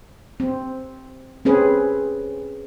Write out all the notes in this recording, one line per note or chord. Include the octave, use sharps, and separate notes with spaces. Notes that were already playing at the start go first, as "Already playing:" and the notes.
C4
C4 C#4 G#4 B4